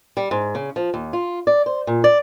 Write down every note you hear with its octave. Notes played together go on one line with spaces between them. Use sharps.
G3
G#2
C#3
F3
D#2
F4
D5
C5
A#2
D5